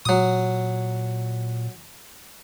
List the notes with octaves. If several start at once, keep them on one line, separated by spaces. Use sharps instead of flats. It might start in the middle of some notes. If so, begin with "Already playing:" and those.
A#2 F#3 D#6